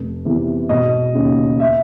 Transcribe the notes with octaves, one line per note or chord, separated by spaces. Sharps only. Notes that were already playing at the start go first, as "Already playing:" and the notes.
Already playing: F1
E2 C3 E3
E1 D#5
D#2 C#3
E5